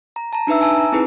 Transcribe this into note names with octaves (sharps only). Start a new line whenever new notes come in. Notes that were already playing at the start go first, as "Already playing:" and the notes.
A#5
A5 A#5
D4 D#4 B4 E5 E6
G#5 A5 E6
A#5
C4 D#4 E4 G#4 B4